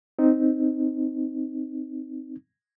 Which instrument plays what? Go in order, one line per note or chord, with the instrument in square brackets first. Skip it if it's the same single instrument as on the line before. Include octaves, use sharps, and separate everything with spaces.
[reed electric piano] C4 D#4